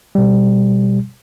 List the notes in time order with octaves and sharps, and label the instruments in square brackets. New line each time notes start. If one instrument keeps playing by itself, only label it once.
[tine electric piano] B2 G3